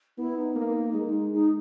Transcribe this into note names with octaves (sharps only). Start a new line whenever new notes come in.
B3 E4
D#4
A#3
G#3
D#4